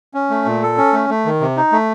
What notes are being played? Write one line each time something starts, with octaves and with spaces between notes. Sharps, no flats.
C#4
A3
A#2
A4
C#4
A3
A3
D#3
C3
D#4
A3